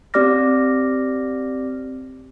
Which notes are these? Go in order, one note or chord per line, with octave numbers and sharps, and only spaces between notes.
C4 G4 D5 D6 F6 A#6